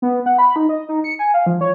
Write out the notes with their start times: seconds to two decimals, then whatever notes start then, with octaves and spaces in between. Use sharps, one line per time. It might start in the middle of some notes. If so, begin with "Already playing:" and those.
0.02 B3
0.26 F#5
0.38 B5
0.56 D#4
0.69 D#5
0.89 D#4
1.04 C#7
1.19 G#5
1.34 F5
1.46 F3
1.61 C#5